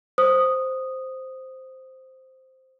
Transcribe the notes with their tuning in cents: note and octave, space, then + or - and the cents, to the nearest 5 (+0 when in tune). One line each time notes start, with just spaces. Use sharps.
C5 +0 D#6 -5